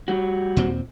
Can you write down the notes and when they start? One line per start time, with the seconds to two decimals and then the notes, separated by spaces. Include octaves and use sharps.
0.08 G3 F#4
0.57 D#2 A#2 C4